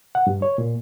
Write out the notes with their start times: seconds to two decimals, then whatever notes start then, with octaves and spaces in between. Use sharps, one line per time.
0.15 F#5
0.27 G2
0.42 C#5
0.58 A#2